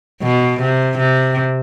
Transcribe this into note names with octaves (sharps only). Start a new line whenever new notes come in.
B2
C3
C3